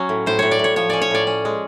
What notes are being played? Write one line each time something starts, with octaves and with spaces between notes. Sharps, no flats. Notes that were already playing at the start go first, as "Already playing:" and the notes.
Already playing: F#3 C#4
A2
A2 C5
A2 C#5
D5
A2 C#5
F3 C#5
C#4 D5
C#5
A2 D5
C#4
G#3